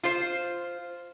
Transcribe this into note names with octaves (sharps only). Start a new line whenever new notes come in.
F4 C5